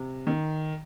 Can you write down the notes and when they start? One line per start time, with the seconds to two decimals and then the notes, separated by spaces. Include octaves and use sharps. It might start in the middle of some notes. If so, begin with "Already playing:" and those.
Already playing: C3
0.27 D#3